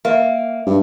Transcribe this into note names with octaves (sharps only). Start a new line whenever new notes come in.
A#3 E5
G2